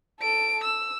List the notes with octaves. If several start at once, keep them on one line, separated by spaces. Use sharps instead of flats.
A4 D7
E6